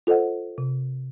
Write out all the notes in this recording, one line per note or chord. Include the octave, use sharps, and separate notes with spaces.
F4 A4 C5 D#5 F#5
C3